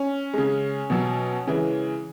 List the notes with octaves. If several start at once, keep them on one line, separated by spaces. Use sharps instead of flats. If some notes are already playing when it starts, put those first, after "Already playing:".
Already playing: C#4
C#3 G#3
B2 F#3
C#3 E3 G#3